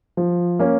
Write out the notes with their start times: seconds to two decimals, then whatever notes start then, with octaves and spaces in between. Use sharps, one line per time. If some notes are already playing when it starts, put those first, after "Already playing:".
0.17 F3
0.59 A#3 C#4